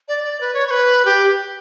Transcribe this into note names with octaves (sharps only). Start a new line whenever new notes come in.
D5
D5
B4
C#5
C#5
B4
G4